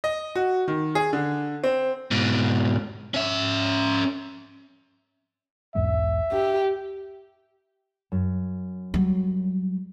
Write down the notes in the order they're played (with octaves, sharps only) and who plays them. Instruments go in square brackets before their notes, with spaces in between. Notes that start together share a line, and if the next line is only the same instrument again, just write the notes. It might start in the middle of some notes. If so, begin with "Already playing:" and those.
[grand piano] D#5
F#4
D#3
G#4
D3
C4
[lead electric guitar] G#2 B2
C#4 E5
[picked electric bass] B1 E2 G#2 [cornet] E5
[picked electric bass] D4 [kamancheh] G4
[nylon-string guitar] F#2
[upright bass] F#3 G3